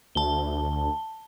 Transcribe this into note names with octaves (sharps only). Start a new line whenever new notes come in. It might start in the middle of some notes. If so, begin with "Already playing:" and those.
D2 A5 G7